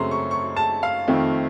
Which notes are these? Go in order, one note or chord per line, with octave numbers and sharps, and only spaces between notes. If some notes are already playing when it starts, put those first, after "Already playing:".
Already playing: F#2 C#3 A3 C4 A#5 C6
C#6
C#6
A5
F5
F2 D#3 A3 C4